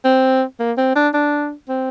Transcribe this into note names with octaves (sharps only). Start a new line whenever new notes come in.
C4
A#3
C4
D4
D4
C4